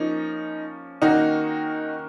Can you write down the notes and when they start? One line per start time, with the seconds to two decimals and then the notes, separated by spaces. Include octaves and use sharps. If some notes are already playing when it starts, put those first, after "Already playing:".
Already playing: F3 A#3 C#4 D#4
1.02 D#3 A#3 C#4 D#4 F#4